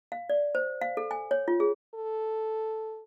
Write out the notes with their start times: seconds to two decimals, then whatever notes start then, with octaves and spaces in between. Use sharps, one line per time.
0.12 F5
0.30 D5
0.55 C5
0.81 F5
0.97 A4
1.11 G#5
1.31 C#5
1.48 F4
1.60 G#4
1.94 A4